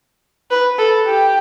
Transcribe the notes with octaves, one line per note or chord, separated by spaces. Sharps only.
B4
A4
G4